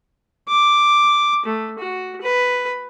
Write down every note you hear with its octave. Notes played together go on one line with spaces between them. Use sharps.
D6
A3
F#4
B4